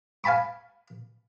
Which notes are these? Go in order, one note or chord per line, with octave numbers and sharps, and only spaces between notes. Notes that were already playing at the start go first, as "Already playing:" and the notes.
F5 G#5 A5 B5 C#6